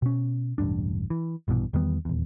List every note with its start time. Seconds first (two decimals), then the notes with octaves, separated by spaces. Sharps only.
0.02 B2 C#4
0.58 E1 A1 G2 D4
1.10 E3
1.48 A#1 G2 B2 E3
1.73 E2 D#3 G3 B3
2.05 D#1 E2